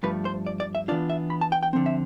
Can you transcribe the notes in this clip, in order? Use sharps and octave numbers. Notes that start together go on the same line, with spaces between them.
G2 F3 A3 B4
C5
D5
D5
E5
E3 B3 D4 F4 D5
E5
B5
A5
G5
G5
D3 F3 C4
E5